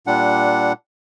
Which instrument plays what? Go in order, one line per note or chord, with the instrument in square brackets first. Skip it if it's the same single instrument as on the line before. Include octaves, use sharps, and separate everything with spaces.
[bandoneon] A#2 G3 D4 F#5